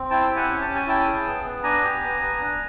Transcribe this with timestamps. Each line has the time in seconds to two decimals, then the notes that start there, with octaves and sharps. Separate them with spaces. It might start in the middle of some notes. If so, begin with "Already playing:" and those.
Already playing: C4
0.10 E4 G5 A5
0.30 G4
0.36 F#5 G#5
0.50 C#4
0.61 A5
0.68 C#4
0.75 G#5
0.87 E4 G5 A5
1.07 G#4
1.26 B3
1.44 B3
1.63 D4 G#5 A#5
1.84 G4
2.03 B3
2.21 B3
2.40 D4